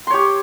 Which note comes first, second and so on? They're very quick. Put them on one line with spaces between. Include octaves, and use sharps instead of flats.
C6 C#5 G4